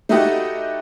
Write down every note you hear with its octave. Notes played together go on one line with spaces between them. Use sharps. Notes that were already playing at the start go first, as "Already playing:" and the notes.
A3 D#4 E4 F#4 G4 D#5